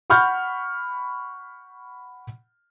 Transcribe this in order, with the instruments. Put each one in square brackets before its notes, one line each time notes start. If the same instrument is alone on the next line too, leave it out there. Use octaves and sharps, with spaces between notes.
[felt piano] F#5 B5 C#6 F6 G6